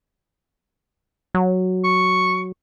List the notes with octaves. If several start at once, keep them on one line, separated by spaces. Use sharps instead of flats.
F#3
C#6